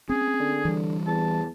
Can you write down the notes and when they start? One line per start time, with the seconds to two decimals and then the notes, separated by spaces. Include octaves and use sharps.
0.09 C4 C#4 G#4
0.40 D3
0.65 E3 G3
1.07 E2 A5